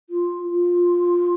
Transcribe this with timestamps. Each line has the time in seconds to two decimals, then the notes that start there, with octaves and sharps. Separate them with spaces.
0.10 F4
0.50 F4